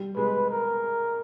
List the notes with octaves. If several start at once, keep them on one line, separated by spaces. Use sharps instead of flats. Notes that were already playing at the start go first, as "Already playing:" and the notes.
Already playing: G3
G#3 B4
A#4